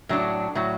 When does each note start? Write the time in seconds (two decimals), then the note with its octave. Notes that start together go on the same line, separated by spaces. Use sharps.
0.09 A2 F#3 D4
0.55 A2 F#3